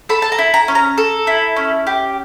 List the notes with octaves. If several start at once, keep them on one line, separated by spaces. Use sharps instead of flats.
A4 B5
A5
A#5
E4
A#5
C#4
A#5
A4
E4
C#4
G4